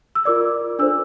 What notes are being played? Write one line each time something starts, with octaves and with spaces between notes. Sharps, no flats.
E6
F4 A#4 D5 D6
D4 A4 C5 E6